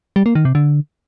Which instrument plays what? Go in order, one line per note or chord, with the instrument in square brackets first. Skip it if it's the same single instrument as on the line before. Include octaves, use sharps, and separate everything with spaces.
[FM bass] G3
A#3
D#3
C3
D3